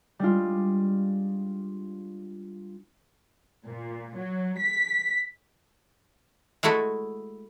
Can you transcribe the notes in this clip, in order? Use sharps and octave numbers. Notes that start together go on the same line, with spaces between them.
G3 G#3 D4 F4
A#2
F#3
B6
G#3 A3 E4 F#4 A4